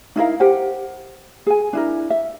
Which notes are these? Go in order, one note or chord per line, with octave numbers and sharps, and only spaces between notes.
D#4 E4 A#4 F5
G4 A#4 C5 F#5
G#4 G#5
D4 E4 A#4
E5